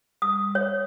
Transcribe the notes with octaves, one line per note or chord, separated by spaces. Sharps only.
D#6
C#5